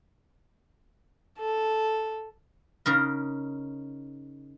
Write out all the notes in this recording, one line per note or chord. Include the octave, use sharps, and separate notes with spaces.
A4
C#3 D#4 A#4